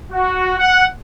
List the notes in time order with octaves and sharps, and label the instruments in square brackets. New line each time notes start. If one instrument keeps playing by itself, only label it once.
[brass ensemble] F#4
F#5